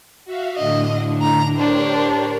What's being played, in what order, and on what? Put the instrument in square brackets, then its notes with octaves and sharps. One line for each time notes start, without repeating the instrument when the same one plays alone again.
[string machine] F#4 E5 F5
[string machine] A2 D3 D4 [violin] D#5
[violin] A#5
[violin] D4 C5 [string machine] G4 A#4 C#5